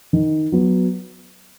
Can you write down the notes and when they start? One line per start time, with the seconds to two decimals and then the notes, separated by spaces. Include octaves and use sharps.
0.13 D#3
0.52 F#3 B3